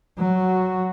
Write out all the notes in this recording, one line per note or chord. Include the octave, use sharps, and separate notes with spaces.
F#3 F#4